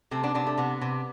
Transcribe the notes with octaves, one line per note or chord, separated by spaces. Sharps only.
C3 A3 C4
B3 D4
C3 B3 D4
A3
C3 B3
C3